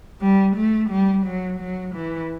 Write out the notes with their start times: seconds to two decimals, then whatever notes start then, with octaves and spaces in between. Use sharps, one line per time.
0.21 G3
0.56 A3
0.90 G3
1.26 F#3
1.60 F#3
1.95 E3